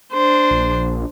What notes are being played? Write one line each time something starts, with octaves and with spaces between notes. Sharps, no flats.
D4 C5
A#1